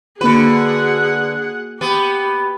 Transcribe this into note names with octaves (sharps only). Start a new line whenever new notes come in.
D3 A#3 F#4 G#4 B4 F#5
B3 G4